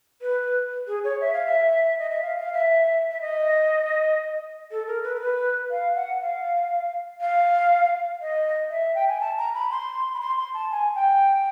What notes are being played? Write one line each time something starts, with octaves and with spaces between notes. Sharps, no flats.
B4
G#4
C#5
E5
F5
E5
D#5
E5
F5
F5
E5
E5
D#5
A4
A#4
B4
A#4
B4
F5
F#5
F5
F5
D#5
E5
G5
G#5
A5
A#5
B5
C6
B5
C6
C6
A5
G#5
G5